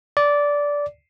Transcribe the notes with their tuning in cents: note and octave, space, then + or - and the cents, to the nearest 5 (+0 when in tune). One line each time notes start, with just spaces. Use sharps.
D5 -15